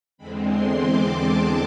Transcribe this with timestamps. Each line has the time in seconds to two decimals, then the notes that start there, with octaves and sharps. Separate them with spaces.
0.18 E2 D3 G#3 C4 B5
0.47 C6
0.75 D6
1.04 A5